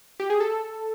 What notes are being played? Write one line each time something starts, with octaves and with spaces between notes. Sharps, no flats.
G4
G#4
A4